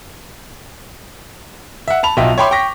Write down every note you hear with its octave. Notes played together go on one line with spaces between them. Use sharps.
E5 F#5
A5 B5 F7
B1 F#3 F4 D#5 E5 G5
C#5 E5 G5 B5 C6 D6
G5 C#6 A#6 B6